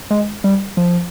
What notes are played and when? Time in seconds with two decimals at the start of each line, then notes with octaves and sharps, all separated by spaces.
0.10 G#3
0.44 G3
0.77 F3